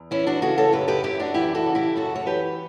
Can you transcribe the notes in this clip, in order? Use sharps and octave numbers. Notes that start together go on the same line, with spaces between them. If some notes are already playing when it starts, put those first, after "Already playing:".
Already playing: E2
E3 C#4 E4
D4 F#4
C#3 F#4 A4
A4 C#5
F#2 G4 B4
G4 B4
F#2 E4 G4
D4 F#4
E3 E4 G4
F#4 A4
C#3
E4 G4
F#2 F#4 A4
C#5
E3 G4 B4